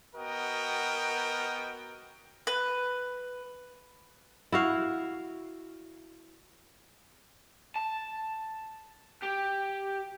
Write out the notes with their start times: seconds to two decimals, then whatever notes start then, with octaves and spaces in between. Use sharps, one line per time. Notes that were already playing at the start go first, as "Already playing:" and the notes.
0.16 B3 F#4 A#4 D#5 G5
2.47 B4
4.52 E4 F#4 F5
7.76 A5
9.22 G4